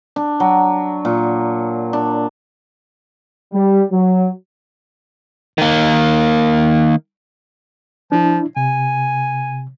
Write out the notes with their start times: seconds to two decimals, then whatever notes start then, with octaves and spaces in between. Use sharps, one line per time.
0.16 D4
0.40 F#3
1.05 A#2
1.93 D4
3.53 G3
3.91 F#3
5.58 D#3 A#3
8.12 F3 D4 E4
8.57 C3 G#5